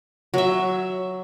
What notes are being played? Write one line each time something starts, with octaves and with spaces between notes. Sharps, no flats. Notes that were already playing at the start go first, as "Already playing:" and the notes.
F#3 E5